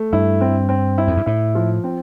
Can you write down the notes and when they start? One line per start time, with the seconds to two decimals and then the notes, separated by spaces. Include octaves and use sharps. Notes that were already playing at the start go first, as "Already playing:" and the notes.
Already playing: A3
0.13 G2 E4
0.41 C4
0.69 C4
0.98 E4
1.07 F2
1.17 G2
1.26 A2 E4
1.55 F3
1.84 C4